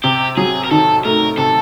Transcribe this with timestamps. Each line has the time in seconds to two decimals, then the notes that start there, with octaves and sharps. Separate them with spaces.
0.04 C3 G4
0.37 F#3 G#4
0.64 A#4
0.71 D#3 A4
1.05 A3 A#4
1.37 C3 A4